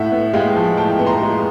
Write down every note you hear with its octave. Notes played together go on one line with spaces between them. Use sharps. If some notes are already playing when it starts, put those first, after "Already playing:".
Already playing: A2 E5 F#5
B3
G#3 F5 G5
F3
A2 G5 A5
B3
A#5 C6
G#3